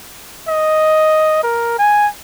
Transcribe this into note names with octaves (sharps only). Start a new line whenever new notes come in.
D#5
A#4
G#5